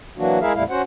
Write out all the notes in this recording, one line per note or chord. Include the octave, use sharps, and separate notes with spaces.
E3 F#3 A#3 D4 F#4
G#3 E4 G#4 A#4 E5 F5
F2 A#2 G3 A3 E4 F5
C#4 F#4 C5 F#5